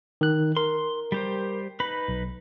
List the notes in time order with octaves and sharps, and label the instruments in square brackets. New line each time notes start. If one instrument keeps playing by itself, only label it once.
[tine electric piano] D#3 F#6
[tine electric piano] A#4 [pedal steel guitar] C6
[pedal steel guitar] G3 G4 C5
D#4 B4 B5
[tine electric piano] B1